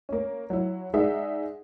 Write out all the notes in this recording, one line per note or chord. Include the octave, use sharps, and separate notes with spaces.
A#3 C#4
F#3 E4
G#3 D#4 G#4 D5 E5 F#5